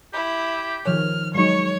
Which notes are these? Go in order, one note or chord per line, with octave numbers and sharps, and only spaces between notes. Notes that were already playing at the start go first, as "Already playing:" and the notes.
E4 G4
D#3 F3 C#5 F6
F#3 G#3 D#4 C#5 C#6